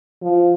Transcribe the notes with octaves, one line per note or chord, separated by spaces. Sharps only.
F3